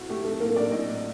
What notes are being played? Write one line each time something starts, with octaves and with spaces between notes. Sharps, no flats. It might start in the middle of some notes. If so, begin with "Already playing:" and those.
Already playing: A2 C4 F#4
A3 G4
A3 A4
A2 A#3 A#4
D4 D5
A2 D#4 D#5